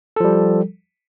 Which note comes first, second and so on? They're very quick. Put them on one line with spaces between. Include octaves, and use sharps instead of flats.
A4 F3 G3